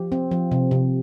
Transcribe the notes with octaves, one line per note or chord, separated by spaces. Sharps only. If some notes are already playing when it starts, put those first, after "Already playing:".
Already playing: F3 G4
C4
F3
C3
C3